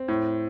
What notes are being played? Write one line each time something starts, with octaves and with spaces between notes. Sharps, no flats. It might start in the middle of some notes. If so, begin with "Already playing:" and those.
Already playing: C4
A2